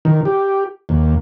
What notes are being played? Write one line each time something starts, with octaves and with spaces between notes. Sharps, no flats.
D#3
G4
D#2